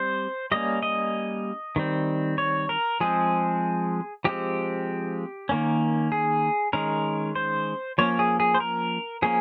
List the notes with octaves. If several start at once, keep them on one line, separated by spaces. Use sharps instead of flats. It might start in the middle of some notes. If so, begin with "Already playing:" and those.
Already playing: G3 C4 C5
G3 A#3 C#4 D#5
D#5
D#3 G3 C4
C#5
A#4
F3 G#3 C4 G#4
F3 G#3 C4 G4
D#3 A#3 C#4
G#4
D#3 G#3 C#4 A#4
C5
F3 A#3 C#4 C#5
G#4
G#4
C5
A#4
F3 A#3 C#4 G#4